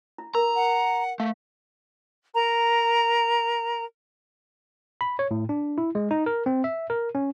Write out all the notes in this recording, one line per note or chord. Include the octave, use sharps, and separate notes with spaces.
E4
A#4 A#5
F#5
A3 F5
A#4 A#5
B5
C#5
A2
D4
E4
G#3
D#4
A#4
C4
E5
A#4
C#4